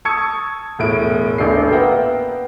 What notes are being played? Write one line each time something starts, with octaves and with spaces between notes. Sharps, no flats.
A5 C#6 D#6 E6 G#6 C#7
E1 A2 D7
D#1 A1 D4 C7
A#3 B3 A#4 E5 F#5 G5